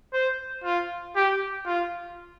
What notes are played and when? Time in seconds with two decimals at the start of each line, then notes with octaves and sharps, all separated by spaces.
0.13 C5
0.64 F4
1.16 G4
1.66 F4